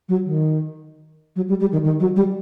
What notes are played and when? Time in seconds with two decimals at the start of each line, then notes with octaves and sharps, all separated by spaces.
0.09 F#3
0.25 D#3
1.36 F#3
1.49 G3
1.60 G3
1.72 D#3
1.84 D#3
2.00 F#3
2.16 G3